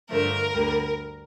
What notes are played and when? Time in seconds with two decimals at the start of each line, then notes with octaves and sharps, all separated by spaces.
0.10 G2 D3 F3 A3 A#4
0.54 D2 D3 G3